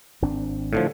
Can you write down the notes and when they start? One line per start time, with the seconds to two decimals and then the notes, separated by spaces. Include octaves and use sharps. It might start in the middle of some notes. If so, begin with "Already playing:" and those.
0.22 G#1 C4 D4
0.73 A2 D3 F3